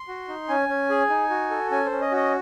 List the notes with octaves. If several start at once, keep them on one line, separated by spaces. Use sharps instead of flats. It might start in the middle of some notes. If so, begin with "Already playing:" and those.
Already playing: C6
F#4
D#4
C#4 G#5
C#4
G#4
D#4
F#4
A4
C#4 G#5
C5
C#4
D#5
F#4 D#5